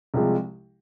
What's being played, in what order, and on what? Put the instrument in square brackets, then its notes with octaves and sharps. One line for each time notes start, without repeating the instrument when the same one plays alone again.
[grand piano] C2 C3 F3 G#3